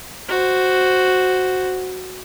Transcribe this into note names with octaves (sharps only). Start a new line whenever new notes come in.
F#4 C5